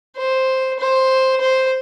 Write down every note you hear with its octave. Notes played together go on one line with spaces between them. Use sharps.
C5
C5
C5